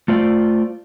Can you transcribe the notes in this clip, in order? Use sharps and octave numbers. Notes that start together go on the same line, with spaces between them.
A3 F4 C5 D5